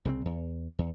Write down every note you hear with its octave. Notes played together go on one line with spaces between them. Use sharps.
C2 C#3 E3 C4
E2
E2